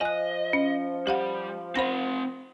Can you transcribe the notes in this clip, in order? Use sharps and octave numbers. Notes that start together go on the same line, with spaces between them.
F3 D#5 G#5 F#6
C#4
G3 G4 F5 F#5
C4 C5 F#5 B5 A#6